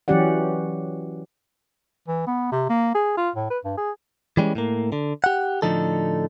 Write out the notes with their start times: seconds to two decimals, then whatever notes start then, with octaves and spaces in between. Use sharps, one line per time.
0.08 E3 F#3 C#4 G4 D5 F#5
2.08 E3
2.27 B3
2.51 C3
2.70 A#3
2.95 G#4
3.17 F4
3.36 A2
3.50 B4
3.64 G2
3.77 G#4
4.37 E3 G3 G#3 C#4
4.55 A2 A#3
4.92 D3
5.24 G4 F#5
5.62 A2 D3 F3 D#4 A4